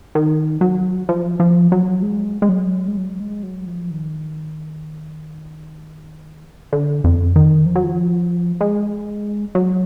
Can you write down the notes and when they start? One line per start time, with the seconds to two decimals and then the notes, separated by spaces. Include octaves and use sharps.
0.15 D#3
0.61 F#3
1.09 F3
1.40 F3
1.72 F#3
2.02 G#3
2.42 G#3
2.49 F#3
2.88 G#3
2.97 F#3
3.20 G#3
3.43 F#3
3.67 F3
3.91 D#3
6.72 D3
7.04 F2
7.36 D#3
7.66 F3
7.75 F#3
7.83 F3
8.61 G#3
9.55 F#3